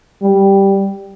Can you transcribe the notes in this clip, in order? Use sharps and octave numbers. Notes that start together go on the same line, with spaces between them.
G3